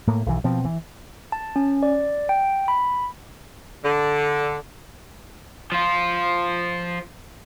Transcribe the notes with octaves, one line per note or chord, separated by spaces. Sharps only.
A2 A#3
B1 D#3 E3
B2 F3 C4
E3
A5
C#4
D5
G5
B5
D3
F3 F4